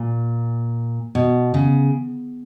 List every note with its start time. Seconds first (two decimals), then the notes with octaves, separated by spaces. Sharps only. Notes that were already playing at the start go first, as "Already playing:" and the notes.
Already playing: A#2
1.15 B2
1.54 C#3